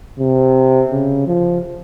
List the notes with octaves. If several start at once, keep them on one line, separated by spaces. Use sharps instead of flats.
C3
C#3
F3